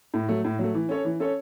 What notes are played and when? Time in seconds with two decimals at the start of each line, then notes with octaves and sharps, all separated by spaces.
0.14 A2
0.29 F#3 A3
0.44 A2
0.59 F#3 A3
0.74 E3
0.89 C#4 A4 C#5
1.05 E3
1.20 C#4 A4 C#5